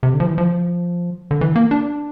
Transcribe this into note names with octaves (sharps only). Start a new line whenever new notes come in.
C3
D3
F3
E3
F3
D3
E3
A#3
D4